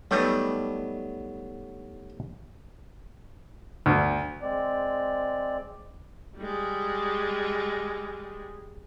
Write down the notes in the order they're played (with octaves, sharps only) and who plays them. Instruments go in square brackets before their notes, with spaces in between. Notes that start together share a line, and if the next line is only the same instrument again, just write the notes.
[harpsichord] F#3 B3 [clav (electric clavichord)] G3 A3 D#4
[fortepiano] D2
[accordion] G#3 C4 D5
[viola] G3 G#3